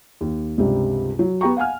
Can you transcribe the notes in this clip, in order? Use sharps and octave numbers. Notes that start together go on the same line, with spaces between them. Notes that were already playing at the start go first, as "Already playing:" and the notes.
D#2
C#2 G2 C3 G3
F#3
B3 G4 G5 A#5 C#6
F5 F#5 G#5 F6